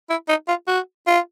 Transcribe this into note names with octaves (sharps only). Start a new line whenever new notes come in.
E4
D#4
F4
F#4
F4